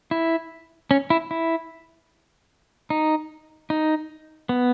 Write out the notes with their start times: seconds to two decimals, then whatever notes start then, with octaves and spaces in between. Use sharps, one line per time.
0.11 E4
0.91 C#4
1.10 E4
1.31 E4
2.90 D#4
3.70 D#4
4.49 B3